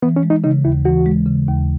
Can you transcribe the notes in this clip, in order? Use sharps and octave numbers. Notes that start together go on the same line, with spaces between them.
E3 B3
C#4
G#3
D#4
C#3 D#4
D#2 E4
E3 F#4
G#3
C#3
D#2